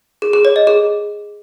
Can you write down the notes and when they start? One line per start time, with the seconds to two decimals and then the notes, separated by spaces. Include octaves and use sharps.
0.22 G#4
0.33 G#4
0.45 C#5
0.56 D#5
0.67 G#4